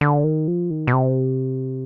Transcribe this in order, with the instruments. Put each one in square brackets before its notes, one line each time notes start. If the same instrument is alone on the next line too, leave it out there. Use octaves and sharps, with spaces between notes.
[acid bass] D3
D#3
F3
D#3
B2
C3